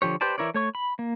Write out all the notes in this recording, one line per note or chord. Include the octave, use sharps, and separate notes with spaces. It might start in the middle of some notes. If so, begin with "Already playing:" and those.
D3 F3 G4 C#5
G4 B4 C5 D5 A5
E3 E4 A#4 C#5 D5
A3 C#5 C#6
B5
A#3